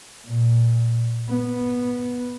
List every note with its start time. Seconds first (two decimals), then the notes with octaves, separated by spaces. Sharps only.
0.25 A#2
1.29 B3